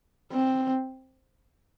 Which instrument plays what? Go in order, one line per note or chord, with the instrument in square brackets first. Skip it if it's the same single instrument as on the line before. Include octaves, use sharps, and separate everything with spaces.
[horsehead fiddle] C4